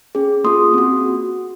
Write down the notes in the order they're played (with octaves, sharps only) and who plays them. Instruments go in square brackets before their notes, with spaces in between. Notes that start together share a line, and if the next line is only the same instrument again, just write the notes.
[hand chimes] C#4 G#4
A#3 F4 G#4 C6 D#6
C4 F#4